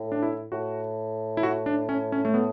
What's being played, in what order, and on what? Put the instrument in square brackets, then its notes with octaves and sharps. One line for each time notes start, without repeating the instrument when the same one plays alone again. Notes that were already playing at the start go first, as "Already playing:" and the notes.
Already playing: [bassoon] A2
[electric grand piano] D4
E4
[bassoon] A2 [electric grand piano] F#4
[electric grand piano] E4
F#4
D4
C#4
C#4
A3
B3